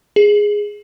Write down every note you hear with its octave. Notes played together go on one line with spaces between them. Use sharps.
G#4